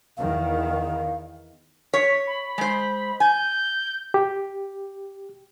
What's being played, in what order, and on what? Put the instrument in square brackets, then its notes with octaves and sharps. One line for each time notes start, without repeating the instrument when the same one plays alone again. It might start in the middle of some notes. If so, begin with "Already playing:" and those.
[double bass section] E2 D#3 [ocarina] F5
[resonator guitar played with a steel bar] C#5 [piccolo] B6
[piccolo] B5
[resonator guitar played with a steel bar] G#3 C5
[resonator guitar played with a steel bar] G#5 [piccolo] G6
[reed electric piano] G4